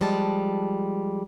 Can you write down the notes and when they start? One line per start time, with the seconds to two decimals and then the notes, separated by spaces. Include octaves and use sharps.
0.01 F3 G3 G#3 A5